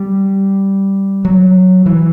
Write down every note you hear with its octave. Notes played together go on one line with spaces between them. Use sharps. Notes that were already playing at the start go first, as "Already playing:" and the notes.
Already playing: G3
F#3
E3